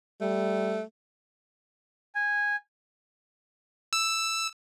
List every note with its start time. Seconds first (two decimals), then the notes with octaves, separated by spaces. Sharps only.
0.21 G3 A3
2.15 G#5
3.93 E6